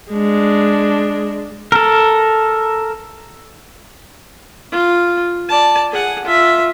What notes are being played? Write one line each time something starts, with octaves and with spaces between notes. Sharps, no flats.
G#3 D4
A4 A#4
F4
D5 A5
G#4 F#5
F4 E5